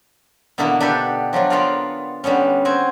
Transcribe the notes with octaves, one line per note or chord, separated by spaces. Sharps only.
B2 D3 E3 A#3 B3
D4 G4 A4 B4
F3 F#3 A3 D4
B3 F4 A#4 D5 F5
D3 G3 B3 C#4
C4 F#4 G#5